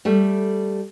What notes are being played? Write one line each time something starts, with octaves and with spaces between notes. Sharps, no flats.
G3 A3